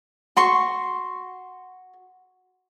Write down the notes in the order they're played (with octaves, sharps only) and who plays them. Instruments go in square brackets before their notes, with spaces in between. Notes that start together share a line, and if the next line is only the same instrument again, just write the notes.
[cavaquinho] F#4 C6 C#6